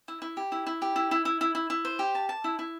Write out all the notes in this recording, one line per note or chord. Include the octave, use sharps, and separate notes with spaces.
E4
E4
G4
E4
E4
G4
E4
E4
E4
E4
E4
E4
C5
G4
A5
A5
E4
E4